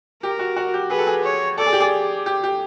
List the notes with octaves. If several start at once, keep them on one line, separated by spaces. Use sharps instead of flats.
G4 A#4
F#4
F#4
G4
G#4 B4
A4
G#4
C#5
A4 D5
G#4
G4
G#4
G4
G4